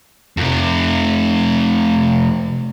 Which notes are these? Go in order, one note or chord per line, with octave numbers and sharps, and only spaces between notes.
F2 C3